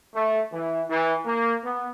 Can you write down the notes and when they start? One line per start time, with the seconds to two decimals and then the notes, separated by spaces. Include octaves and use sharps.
0.14 A3
0.52 E3
0.88 E3
1.25 A#3
1.63 B3